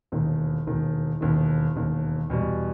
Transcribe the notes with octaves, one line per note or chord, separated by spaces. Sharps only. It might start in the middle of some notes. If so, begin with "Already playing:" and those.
E1 D#2 D#3
E1 D#2 D#3
E1 D#2 D#3
E1 D#2 D#3
E2 B2 G3